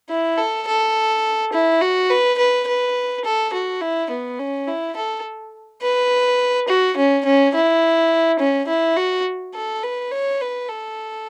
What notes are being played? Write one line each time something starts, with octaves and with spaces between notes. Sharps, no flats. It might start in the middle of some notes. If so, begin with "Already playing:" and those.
E4
A4
A4
E4
F#4
B4
B4
B4
A4
F#4
E4
B3
C#4
E4
A4
B4
F#4
C#4
C#4
E4
C#4
E4
F#4
A4
B4
C#5
B4
A4